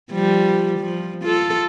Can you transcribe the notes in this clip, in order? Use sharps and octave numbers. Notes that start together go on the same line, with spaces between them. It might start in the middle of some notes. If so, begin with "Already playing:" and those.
F3 G3
F3
F4 A4